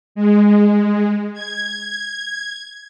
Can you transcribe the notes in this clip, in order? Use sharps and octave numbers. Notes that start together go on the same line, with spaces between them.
G#3
G#6